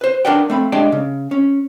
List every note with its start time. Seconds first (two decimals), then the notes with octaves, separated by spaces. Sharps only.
0.01 B4 C5
0.25 D4 A#4 B4 D5 F#5 G5
0.50 A3 C4 B5
0.72 G#3 D4 G4 D5 G5
0.92 C#3
1.31 C#4